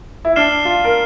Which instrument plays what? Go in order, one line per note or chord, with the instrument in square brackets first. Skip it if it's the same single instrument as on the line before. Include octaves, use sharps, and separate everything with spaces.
[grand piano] E4
[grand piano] D4 [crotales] F6 C7 E7 G7
[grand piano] F4
A#4